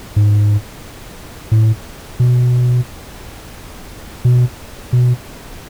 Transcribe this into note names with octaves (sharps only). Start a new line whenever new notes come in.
G#2
A2
B2
B2
B2